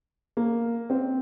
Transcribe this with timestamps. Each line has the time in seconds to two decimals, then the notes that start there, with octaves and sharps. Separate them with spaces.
0.37 A#3
0.90 C4